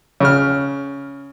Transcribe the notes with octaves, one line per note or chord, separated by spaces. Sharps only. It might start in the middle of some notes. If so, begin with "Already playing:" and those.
C#3 F6